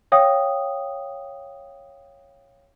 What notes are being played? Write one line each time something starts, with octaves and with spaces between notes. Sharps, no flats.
C#5 F5 G5 D#6